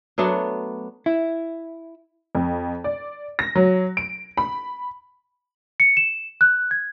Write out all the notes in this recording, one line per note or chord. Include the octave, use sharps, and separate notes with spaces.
F#3 A3 B3 D4
E4
F2
D5
A#6
F#3
D7
B5
C#7
E7
F#6
G#6